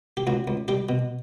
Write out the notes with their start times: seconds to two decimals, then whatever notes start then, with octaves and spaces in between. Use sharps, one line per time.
0.17 G4
0.27 C#2 F#4
0.48 C#2
0.68 G3 G4
0.89 B2